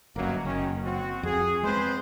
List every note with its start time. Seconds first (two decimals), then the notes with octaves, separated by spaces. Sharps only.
0.16 G1 F#2 B2 F#3 A#3
0.45 F#1 D#3 C#4
0.84 C4 F#4
1.23 F2 G#4
1.63 E2 G#3 C4 B4 C5